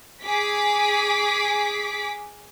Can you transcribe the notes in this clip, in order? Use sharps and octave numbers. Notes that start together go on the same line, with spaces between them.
G#4 D6 B6